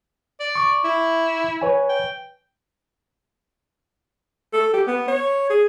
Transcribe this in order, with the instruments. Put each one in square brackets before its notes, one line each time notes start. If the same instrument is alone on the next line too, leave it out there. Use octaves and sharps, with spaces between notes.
[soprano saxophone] D5
[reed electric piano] C#6 D6
[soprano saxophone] E4
[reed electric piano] B4 C#5 G#5
[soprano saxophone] G5
[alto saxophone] A4
G4
B3
C#5
G#4